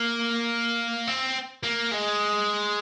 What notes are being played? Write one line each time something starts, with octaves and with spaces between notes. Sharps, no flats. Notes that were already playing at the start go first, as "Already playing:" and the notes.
Already playing: A#3
C4
A#3
G#3